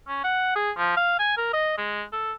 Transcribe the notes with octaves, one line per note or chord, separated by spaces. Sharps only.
C#4
F#5
G#4
F3
F5
G#5
A#4
D#5
G#3
A4